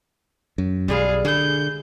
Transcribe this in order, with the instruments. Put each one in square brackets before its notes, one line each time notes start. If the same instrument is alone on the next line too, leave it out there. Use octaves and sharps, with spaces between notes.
[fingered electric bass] F#2
[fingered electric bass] B1 [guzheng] G3 G#3 E4 [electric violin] G#4 F5
[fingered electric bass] D3 [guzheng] E4 G#4 [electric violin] G6